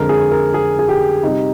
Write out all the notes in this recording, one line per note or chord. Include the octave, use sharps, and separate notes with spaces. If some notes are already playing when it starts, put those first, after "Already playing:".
Already playing: F2 D3 G#3 A#4
G#4
A#4
G#4
G#4
G4
C3 G3 D#4